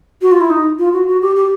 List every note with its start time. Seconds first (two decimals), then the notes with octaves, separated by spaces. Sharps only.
0.22 F#4
0.32 F4
0.41 E4
0.50 D#4
0.79 F4
0.93 F#4
1.07 F#4
1.22 G4
1.36 G4